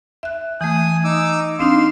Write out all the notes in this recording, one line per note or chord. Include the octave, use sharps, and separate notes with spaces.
E5 F#6
E3 A3 G#5 D#6
D#4 D6 E6
C4 D4 D#4 F5 C6